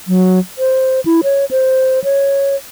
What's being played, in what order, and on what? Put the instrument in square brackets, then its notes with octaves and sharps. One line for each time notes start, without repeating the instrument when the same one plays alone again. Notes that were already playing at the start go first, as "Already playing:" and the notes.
[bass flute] F#3
C5
E4
C#5
C5
C#5